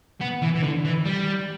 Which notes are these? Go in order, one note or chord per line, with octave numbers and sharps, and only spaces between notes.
B3
E3
E3
D3
E3
G3